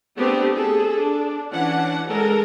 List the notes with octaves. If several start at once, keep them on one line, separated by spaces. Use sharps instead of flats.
A3 B3 C4 D4 G4
G#4 A4
D4
E3 C#4 D4 F#5
G#3 A4 A#4